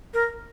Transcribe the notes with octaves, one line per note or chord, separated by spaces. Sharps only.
A#4